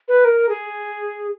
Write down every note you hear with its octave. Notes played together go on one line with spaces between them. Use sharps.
B4
A#4
G#4